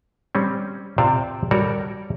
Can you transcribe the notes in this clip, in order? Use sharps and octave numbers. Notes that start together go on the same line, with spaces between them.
G3 C4 C#4
C3 F4 C5 D5 F5 A5
G3 F#4 A4 A#4 C#5 D5